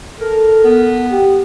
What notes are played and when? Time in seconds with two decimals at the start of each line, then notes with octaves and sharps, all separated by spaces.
0.20 A4 A#4
0.64 B3
1.11 G4